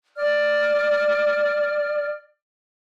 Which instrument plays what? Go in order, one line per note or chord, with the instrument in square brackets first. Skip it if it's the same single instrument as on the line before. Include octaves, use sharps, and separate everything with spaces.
[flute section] D5 F6